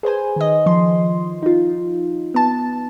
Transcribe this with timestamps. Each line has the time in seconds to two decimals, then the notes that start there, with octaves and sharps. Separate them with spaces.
0.03 G#4 B4 C5 G#5
0.36 D#3 D#5
0.66 F3 C6
1.43 D#4 F4
2.34 B3 A5